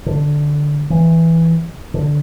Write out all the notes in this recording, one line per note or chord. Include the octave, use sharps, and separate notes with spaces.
D3
E3
D3